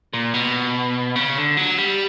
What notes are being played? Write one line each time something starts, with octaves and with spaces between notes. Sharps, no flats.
A#2
B2
C#3
D3
F#3
G3